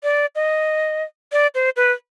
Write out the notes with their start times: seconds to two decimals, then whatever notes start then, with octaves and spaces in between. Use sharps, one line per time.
0.03 D5
0.35 D#5
1.32 D5
1.55 C5
1.76 B4